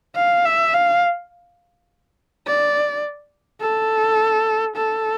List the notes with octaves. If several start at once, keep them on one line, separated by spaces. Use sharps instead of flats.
F5
E5
F5
D5
A4
A4